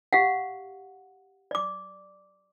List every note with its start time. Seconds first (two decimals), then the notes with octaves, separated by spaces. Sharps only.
0.13 G4 F5 F#5
1.51 D5 D6